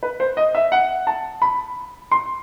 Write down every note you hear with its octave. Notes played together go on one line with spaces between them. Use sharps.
B4
C5
D#5
E5
F#5
A5
B5
C6